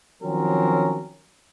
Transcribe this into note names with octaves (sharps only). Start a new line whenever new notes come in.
D#3 F3 F#3 C4 C#4 A#4